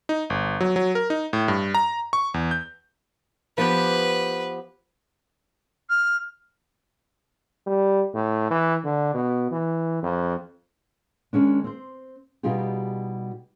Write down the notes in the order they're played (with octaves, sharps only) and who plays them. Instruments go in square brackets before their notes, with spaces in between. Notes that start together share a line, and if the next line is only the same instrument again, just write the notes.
[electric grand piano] D#4
G1
F#3
F#3
A#4
D#4
A2
G2
A#5
C#6
E2
G6
[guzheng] F3 B3 G4 [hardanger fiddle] B4
[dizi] F6
[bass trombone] G3
A2
E3
D3
B2
E3
F2
[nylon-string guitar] D#3 G#3 C#4 D4
C4 C5
B2 G3 D#4 F4 G4 G#4